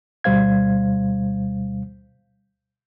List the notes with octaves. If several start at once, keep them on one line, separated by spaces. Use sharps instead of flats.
D2 B2 G3 C5 F5 G#6